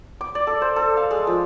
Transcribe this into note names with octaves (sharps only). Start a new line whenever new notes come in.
D6
D5
A4
C5
A4
F5
G#3
F3